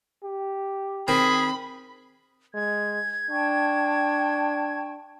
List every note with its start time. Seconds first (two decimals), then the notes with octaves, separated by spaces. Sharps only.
0.23 G4
1.08 D#3 C4 G#4 B5
2.54 G#3 G#6
3.30 D4 G5 A5 C#6